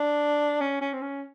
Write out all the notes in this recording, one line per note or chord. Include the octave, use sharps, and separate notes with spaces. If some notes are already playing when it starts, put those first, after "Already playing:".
Already playing: D4
C#4
C#4
C4
C#4